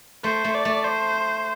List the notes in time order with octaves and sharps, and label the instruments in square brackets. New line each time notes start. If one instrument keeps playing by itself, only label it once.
[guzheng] A3 [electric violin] C5
[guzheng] A3
[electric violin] D5
[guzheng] A3
[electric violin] C5